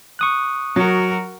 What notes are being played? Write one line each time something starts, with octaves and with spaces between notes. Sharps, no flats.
C#6 D#6 F#6
F#3 F#4 A#4